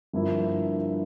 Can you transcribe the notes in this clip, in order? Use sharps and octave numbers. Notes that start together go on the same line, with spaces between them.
G1 G2 F3 A#3 E4